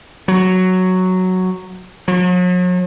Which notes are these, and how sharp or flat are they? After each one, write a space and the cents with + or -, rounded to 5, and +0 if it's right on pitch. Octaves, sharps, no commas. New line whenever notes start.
F#3 +0
F#3 -45